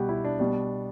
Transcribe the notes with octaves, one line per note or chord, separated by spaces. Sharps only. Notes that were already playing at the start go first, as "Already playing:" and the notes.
Already playing: B2 G3 G4 F#5
E4
D4
B2 G3 D4